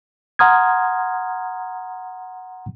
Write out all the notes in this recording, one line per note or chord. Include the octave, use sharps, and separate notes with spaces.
F#5 A#5 C6 D#6 F6 G#6